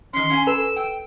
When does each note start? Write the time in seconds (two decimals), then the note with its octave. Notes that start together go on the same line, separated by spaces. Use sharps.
0.13 D#3 C#4 C6
0.30 C#4 F5 G#5
0.47 A4 B4 E6
0.76 G5